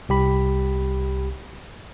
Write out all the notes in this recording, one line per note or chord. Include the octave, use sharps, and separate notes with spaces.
C2 G4 B5